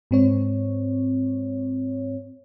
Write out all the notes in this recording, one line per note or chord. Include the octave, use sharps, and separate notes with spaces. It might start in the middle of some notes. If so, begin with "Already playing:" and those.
G#2 C4 C#5